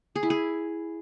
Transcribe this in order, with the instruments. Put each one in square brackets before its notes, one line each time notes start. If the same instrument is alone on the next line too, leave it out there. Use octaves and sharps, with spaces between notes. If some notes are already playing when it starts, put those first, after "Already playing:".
[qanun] G#4
E4
G#4